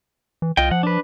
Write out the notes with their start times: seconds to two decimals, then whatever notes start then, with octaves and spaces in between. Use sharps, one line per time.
0.42 E3
0.57 C2 F4 D#5 G5
0.71 F3 F#5
0.83 D4 B4